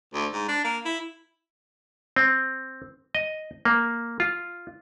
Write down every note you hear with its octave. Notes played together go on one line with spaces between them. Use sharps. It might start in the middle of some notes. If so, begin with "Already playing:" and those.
D2
G#2
D4
A#3
E4
C4
D#5
A#3
F4